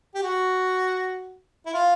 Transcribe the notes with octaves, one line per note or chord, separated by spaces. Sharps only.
G4
F#4
E4
F4